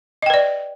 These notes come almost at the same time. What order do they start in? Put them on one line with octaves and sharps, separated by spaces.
D#5 G5 B4 D5